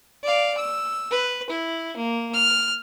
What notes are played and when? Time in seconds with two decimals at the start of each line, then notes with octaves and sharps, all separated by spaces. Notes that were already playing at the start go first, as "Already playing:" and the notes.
0.23 D5 F5
0.57 E6
1.11 B4
1.50 E4
1.97 A#3
2.33 F6